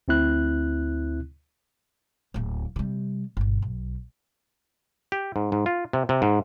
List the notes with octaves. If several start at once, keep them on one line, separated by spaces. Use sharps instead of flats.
D2 C4 E4 F#6
D1 A#3
C3 G3
G1 B2
B1
G4
G#2
G#2
F4
C3
C3
G#2